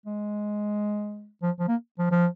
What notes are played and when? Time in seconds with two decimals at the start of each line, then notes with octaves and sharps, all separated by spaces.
0.06 G#3
1.43 F3
1.60 F3
1.68 A#3
1.99 F3
2.11 F3